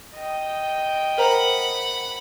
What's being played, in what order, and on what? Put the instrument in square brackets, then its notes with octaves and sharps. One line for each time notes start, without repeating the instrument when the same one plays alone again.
[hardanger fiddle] D#5 G5
[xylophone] A#4 C5 A#5 [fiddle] F#5 B5